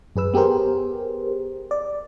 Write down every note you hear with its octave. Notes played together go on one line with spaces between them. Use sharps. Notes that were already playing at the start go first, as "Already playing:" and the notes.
F#2 G#4 B4 E6
B3 G4 G#4 A#4 C5
D5